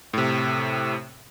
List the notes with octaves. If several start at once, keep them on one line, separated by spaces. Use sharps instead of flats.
A2 C3